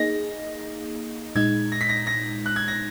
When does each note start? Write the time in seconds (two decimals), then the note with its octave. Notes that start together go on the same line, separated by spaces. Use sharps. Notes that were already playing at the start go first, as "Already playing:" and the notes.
Already playing: A#3 D#4 G#4 D#5 A#6
1.35 A#2 G#3 D#4 G#6
1.72 A#6
1.81 B6
1.89 A#6
2.07 A#6
2.46 F#6
2.56 G#6
2.68 A#6